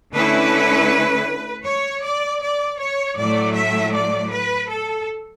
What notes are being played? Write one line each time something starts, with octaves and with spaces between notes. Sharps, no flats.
D3 A3 C#4 E4 B4
C#5
D5
D5
C#5
A2 F#3 A3 D5
E5
D5
B4
A4